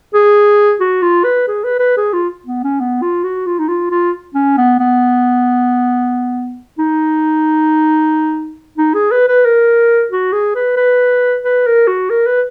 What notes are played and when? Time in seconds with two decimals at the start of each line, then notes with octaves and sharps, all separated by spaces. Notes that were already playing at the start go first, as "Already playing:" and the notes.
0.14 G#4
0.80 F#4
1.02 F4
1.24 B4
1.47 G#4
1.64 B4
1.79 B4
1.97 G#4
2.13 F4
2.46 B3
2.64 C#4
2.80 B3
3.02 F4
3.24 F#4
3.46 F4
3.59 D#4
3.68 F4
3.91 F4
4.34 C#4
4.58 B3
4.79 B3
6.78 D#4
8.78 D#4
8.94 G#4
9.11 B4
9.28 B4
9.45 A#4
10.11 F#4
10.33 G#4
10.55 B4
10.77 B4
11.44 B4
11.66 A#4
11.87 F#4
12.10 A#4
12.26 B4